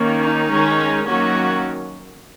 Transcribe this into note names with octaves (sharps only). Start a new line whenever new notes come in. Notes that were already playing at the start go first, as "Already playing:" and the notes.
Already playing: D#3 A#3 C#4
D#4
D#3 G#3 C#4
D#3 F#3 A#3 C#4 F#4